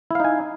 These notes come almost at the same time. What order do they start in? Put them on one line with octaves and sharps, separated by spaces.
E4 F5 D#4 G#5